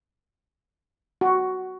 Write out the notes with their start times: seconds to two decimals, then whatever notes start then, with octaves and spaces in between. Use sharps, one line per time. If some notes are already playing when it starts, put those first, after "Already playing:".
1.21 F#4